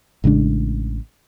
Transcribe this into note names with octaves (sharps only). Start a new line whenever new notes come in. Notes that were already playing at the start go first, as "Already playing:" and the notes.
A1 C#3 G#3 D4